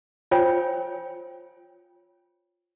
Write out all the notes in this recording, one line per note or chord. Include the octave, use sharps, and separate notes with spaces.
F4 C5 C#5 G5 G#5